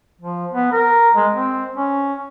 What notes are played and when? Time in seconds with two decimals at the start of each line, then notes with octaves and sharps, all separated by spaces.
0.21 F3
0.52 B3
0.72 A#4
1.16 G#3
1.34 C4
1.76 C#4